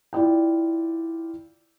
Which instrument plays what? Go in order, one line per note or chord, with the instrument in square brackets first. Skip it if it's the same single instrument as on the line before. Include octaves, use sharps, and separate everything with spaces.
[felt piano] E4 F4 D5 G5